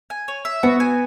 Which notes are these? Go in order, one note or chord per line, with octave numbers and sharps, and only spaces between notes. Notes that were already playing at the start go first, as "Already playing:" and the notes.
G#5
C#5
E5
B3 F#4
G#5